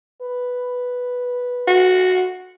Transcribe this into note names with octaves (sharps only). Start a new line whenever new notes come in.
B4
F#4